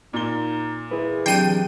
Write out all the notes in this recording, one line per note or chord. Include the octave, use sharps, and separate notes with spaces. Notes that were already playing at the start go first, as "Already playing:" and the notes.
A#2 D#4 G7
E4 G#4 B4
C3 E3 F#3 D4 G5 C7 D#7